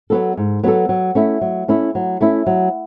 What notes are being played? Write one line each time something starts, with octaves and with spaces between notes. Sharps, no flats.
F#3 B3 F#4 A4
G#2
F#3 B3 F#4 A4
F#3
A3 C#4 E4
F#3
A3 C#4 E4
F#3
A3 C#4 E4
F#3